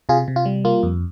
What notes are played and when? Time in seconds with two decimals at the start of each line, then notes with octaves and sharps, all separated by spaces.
0.09 C3 F4 G#4
0.28 C3
0.36 F4
0.45 G3
0.65 A#3 F4
0.83 F2